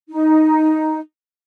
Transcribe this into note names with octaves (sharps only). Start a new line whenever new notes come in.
D#4